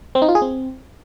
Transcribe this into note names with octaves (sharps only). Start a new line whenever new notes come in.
C4
D#4
F4
G#4
C4